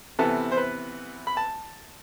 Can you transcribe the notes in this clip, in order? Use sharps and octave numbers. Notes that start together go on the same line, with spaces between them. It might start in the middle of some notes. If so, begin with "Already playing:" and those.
C3 E3 B3 A4
C5
B4
B5
A5